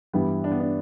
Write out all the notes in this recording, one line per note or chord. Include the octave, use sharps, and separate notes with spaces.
G2 E3 G3 B3 E4
D4
B3
D4